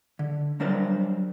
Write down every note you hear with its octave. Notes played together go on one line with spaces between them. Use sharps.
D3
F#3 G3 D4 A#4 C5 D5